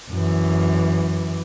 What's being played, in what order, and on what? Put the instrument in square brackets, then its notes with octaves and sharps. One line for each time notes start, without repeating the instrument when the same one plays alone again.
[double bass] F#2 E3